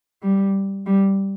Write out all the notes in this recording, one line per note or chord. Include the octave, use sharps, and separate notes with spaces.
G3
G3